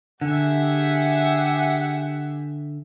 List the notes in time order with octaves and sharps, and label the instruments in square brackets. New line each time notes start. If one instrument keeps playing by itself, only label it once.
[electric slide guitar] D3 [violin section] G4 G#4 E5 [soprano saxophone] F#5